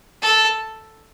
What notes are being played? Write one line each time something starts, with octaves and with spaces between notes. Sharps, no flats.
A4